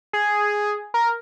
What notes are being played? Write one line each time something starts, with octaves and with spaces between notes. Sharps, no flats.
G#4
A#4